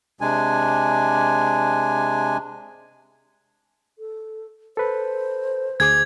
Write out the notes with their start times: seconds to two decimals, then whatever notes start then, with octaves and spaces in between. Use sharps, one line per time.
0.21 C3 G#3 D4 G#5
3.99 A4
4.77 A4 B4 C5
5.80 D2 G#4 D6 G#6